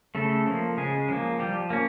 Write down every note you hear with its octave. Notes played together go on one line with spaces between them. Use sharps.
C#3 A3 A4
F3 A#3
C#3 G#3 G#4
F3 A#3
F3 G3 G4
A#3 C#4